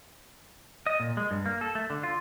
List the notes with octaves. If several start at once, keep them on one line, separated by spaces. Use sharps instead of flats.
D#5
A#2
G#3
G2
A#3
A4
A3
D3
F4